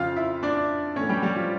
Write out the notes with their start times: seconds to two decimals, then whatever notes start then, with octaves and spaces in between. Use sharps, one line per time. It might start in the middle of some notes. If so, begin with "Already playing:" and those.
Already playing: F2 C#3 F3 F4 F5
0.16 E4 E5
0.43 D4 D5
0.96 A2 E3 A3 C#4 C#5
1.09 G3 G4
1.22 G3 G4
1.36 F3 F4